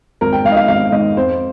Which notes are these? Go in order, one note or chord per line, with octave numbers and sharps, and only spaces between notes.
G#1 A#4
G5
G#2 D#3 D#5 F5
F5
G#1 F5
G#2 D#3 D#5
F2 C5